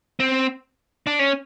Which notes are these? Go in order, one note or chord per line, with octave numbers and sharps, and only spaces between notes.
C4
D4
C#4